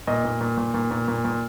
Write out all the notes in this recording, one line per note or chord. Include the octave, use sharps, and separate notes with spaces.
A#2 D#5
A#2
A#2
A#2
A#2
A#2
A#2
A#2